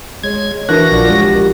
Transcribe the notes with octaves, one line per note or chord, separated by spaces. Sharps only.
G#3 C#5 G#6
E3 D4 F#4 A#4 F#6 A#6
A#1 F3 D4 F4
G#3 G4